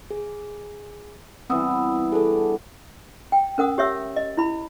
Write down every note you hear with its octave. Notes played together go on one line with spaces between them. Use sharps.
G#4
E3 G3 B3 C4 D#6 E6
D4 G#4 A4
G5
C#4 A#4 F#5 D#6
G4 C#5 E5 E6
D#5
E4 B5